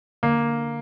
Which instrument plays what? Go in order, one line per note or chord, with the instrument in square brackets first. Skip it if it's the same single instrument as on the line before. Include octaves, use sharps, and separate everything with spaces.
[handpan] D3 [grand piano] A#3